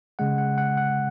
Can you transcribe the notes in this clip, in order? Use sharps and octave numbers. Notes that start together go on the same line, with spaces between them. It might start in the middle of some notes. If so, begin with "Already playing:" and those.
C#3 G#3 F#5
F#5
F#5
F#5